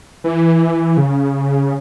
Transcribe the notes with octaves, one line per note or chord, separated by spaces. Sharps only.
E3
C#3